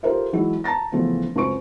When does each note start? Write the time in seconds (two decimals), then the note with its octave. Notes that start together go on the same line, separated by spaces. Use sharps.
0.03 F4 G4 A4 A#4 C5 E5
0.33 E3 F#3 G#3 E4
0.64 A5 A#5 A6 A#6
0.92 C#3 E3 F3 A3 B3
1.36 C#2 F#2 C4 C#6 D7